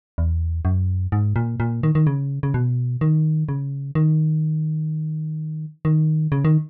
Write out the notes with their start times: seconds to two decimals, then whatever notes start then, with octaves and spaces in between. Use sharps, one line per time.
0.18 E2
0.65 F#2
1.12 G#2
1.36 A#2
1.60 A#2
1.83 D#3
1.95 D#3
2.07 C#3
2.43 C#3
2.54 B2
3.01 D#3
3.49 C#3
3.95 D#3
5.85 D#3
6.32 C#3
6.45 D#3